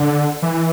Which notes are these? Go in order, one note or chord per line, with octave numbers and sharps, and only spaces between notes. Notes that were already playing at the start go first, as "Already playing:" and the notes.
Already playing: D3
E3